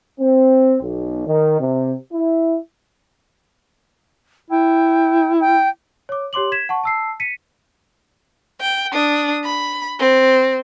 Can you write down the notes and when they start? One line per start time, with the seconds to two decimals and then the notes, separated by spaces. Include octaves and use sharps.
0.20 C4
0.82 B1
1.27 D#3
1.60 C3
2.12 E4
4.51 E4 G5
5.41 G5
6.09 C#5 D6
6.33 G4 C#5 C6 D6 F#7
6.52 G#6 B6 E7
6.69 F#5 A5 C#6
6.84 A5 E6 C7
7.20 B6 C#7 D#7
8.61 G5
8.93 D4 D#6
9.44 B5
9.99 C4